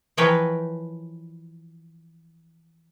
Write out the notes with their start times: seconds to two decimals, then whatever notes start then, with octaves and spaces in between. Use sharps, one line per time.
0.17 E3 F3 A#4 B4 C#5 G5